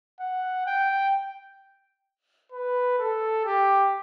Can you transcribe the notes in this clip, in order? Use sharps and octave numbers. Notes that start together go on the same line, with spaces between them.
F#5
G5
B4
A4
G4